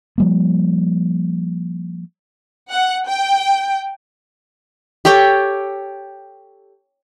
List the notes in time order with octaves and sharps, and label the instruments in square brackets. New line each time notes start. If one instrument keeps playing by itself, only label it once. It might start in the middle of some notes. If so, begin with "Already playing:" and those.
[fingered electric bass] F3 G3 A#3
[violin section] F#5
G5
[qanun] G4 A4 C#5 G5